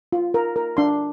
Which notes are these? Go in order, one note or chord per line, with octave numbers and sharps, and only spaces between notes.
F4
A#4
A#4
D4 C6